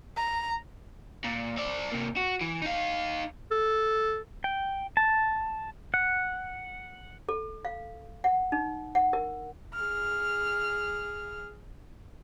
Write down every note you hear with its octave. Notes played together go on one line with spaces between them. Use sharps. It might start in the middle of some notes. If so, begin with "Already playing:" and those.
A#5
A#2
C4 D5
C3 A#3
F#4
E3
D#4 F5
A4
G5
A5
F#5
A4
F5
F#5
D#4
F#5
A#4
G#4 F6